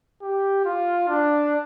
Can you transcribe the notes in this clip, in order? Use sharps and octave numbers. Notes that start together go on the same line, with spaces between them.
G4
F4
D4